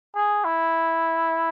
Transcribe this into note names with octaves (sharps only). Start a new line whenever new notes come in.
G#4
E4